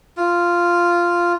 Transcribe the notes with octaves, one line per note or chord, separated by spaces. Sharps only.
F4